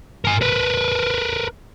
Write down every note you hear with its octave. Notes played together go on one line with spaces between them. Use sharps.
A#4 G#5
A#4 B4